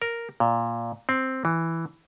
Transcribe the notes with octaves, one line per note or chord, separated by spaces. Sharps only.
A#4
A#2
C4
E3